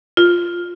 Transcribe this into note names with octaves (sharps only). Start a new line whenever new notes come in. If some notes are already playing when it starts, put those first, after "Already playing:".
F4